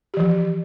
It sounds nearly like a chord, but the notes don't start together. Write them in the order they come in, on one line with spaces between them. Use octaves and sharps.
G4 E3 F3